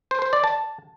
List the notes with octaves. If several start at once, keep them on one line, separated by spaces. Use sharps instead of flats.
C5
C5
D5
A5